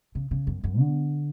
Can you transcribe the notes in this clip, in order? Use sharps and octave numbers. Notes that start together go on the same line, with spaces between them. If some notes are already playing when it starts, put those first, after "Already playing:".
C#3
C#3
F#2
F#2
D3